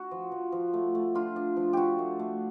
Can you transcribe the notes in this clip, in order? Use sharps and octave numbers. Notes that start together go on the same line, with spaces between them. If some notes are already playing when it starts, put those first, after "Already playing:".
Already playing: F#4
F3
F3
F3
A3
A3
D4 F4
D4
F3
D4 F#4 G4
A3
A3